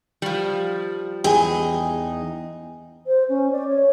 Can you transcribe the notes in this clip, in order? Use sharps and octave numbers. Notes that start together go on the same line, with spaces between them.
F3 G3
E2 D#4 G#4 G5 G#5
C5
C#4
D5
C#5